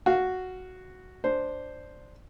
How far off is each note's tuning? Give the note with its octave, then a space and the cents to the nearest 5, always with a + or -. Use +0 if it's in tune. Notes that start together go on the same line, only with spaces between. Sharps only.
F#4 +0 F5 -5
D4 +0 C5 +0